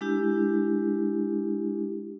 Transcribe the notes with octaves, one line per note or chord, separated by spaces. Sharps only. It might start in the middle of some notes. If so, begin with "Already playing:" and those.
G#3 D4 E4 G4